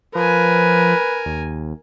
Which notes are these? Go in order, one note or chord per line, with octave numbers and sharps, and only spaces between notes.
F3 A#4 B4 G#5
D#2